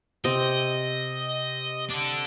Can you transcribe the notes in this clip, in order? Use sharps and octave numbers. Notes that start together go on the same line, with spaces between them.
C3 C4 D#5
D4 A4